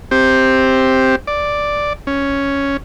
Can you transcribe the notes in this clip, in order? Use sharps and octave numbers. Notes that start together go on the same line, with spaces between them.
C4 G4
D5
C#4